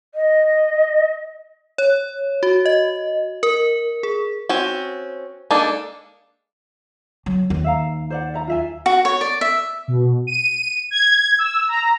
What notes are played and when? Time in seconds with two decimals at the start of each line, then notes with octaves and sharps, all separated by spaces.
0.15 D#5
1.78 C#5
2.43 F#4
2.66 D#5
3.43 A#4
4.03 G#4
4.49 C4 C#4 F#4
5.51 G#3 A#3 D4 D#4 A4
7.26 F#3
7.50 D#2
7.64 E5 F5 A#5
8.10 C5 D5 F#5
8.34 E5 A#5
8.47 F4 E5 G#5
8.86 F#4
9.05 C#5
9.21 D5
9.41 E5
9.88 B2
10.27 D#7
10.91 G#6
11.38 E6
11.68 A#5